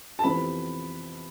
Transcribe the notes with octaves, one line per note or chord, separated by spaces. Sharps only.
A5
F2 C3 E3 B3 E4 B5